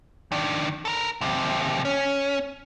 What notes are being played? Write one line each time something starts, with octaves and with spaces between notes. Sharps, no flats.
D#3 D4
A4 A#4
D#2 C3
C#4